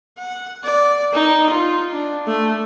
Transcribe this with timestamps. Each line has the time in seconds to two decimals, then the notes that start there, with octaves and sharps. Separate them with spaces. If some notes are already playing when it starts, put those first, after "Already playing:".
0.19 F#5
0.64 D5
1.14 D#4
1.51 F4
1.93 D4
2.27 A3